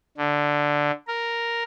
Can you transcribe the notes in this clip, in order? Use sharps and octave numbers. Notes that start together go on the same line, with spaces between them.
D3
A#4